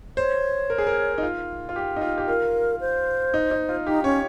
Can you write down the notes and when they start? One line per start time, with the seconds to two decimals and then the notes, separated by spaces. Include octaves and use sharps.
0.17 C5 C#5
0.70 A#4
0.78 G#4
0.87 A#4
1.18 D#4
1.23 F4
1.69 F4
1.76 G4
1.96 D#4
2.02 F4
2.18 G4
2.28 F4 A#4
2.81 C5
3.34 D#4
3.51 D#4
3.69 F4
3.86 D#4 G4
4.04 C#4 C#5